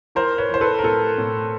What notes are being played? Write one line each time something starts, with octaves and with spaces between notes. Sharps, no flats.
E3 A#4 C5
B4 C#5
E3 C5
A4 B4
A#4
A2 A4
A2